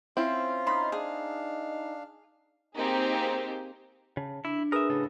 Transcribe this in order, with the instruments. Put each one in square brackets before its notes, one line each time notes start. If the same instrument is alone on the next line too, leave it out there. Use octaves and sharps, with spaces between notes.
[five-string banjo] C4 E4 [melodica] C#4 F4 F5
[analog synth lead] D#4 [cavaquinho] B5 C6
[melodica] D4 F5 [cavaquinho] G#4
[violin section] A#3 C4 D#4 G4 G#4 C5
[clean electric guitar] C#3 [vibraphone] A5
[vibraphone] D4 [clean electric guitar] E4
[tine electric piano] G#4 B4 D#6 [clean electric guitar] A#4 E5
[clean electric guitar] A2 C#3 A4